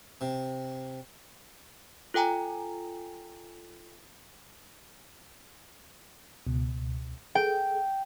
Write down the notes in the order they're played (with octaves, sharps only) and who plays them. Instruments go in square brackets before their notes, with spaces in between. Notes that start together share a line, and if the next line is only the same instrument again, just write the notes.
[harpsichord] C3
[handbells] F4 A4 G5 G#5 A#5
[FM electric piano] C#2 B2
[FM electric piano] G#4 A4 [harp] G5